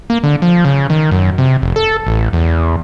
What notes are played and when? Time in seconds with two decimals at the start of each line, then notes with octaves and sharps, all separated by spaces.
0.10 A#3
0.23 D3
0.42 F3
0.65 C#3
0.90 D#3
1.11 F#2
1.38 C3
1.62 F1
1.76 A4
2.07 A1
2.33 E2